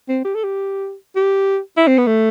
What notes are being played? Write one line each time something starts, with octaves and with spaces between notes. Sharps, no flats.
C4
G4
A4
G4
G4
E4
C4
B3
A3